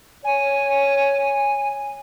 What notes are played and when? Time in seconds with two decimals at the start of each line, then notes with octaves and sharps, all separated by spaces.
0.24 C#5 G#5